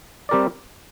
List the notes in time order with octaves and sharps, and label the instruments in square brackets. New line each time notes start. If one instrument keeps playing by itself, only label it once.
[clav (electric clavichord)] G3 C4 G4 A#4 D5